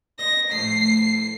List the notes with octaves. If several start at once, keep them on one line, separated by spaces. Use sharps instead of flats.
C5 D#5 A#6
A2 F3 A3 C7